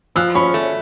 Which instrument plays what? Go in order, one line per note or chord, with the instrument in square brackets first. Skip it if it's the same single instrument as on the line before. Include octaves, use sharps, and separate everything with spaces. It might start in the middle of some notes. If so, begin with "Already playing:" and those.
[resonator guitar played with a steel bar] F3 [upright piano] E6 F#6
[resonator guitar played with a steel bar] C#4 [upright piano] B5 C#6
[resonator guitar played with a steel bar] A3